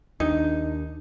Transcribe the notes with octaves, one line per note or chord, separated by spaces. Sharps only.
D#2 D4 D#4